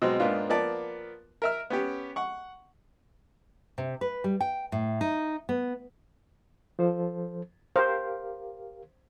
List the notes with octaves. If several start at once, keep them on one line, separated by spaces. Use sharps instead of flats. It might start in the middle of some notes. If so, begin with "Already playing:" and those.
B2 F#3 G#3 C4
G#2 A#3 B3 D4 D#4 F4
F3 A#3 B3 D5 A5
A#4 E5 F6
B3 C#4 G4
F#5 C#6
C3
B4
G3
G5
A2
D#4
B3
F3 A4 C5
G4 A#4 C5 F5